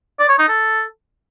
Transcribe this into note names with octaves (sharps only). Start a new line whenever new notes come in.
D5
C#5
D#4
A4